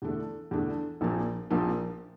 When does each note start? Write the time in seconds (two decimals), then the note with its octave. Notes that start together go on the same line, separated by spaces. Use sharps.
0.02 E2 D3 A3 D4
0.51 E2 D3 A3 D4
1.01 A#1 A#2 F3 A#3
1.51 A#1 A#2 F3 A#3